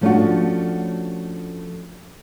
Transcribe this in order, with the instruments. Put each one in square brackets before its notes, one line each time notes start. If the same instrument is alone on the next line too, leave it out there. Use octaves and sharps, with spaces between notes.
[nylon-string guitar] F3 A3 C#4 D4 F4 F#4